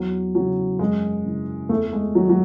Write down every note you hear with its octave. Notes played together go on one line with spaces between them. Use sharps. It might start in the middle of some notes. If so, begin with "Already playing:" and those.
Already playing: E2 F#3
C#3 E3 F#3
F#2 G#3
C#3 E3
E2 A3
G#3
D#3 F#3
F#3